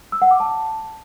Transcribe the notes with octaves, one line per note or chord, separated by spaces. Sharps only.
E6
F#5
D6
A5